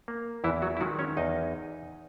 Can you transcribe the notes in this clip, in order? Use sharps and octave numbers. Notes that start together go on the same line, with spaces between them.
A#3
E2 E3 E4
F#3 F#4
E4
D#3 F#3 G#3 F#4
C#4 C#5
E2 D#4 D#5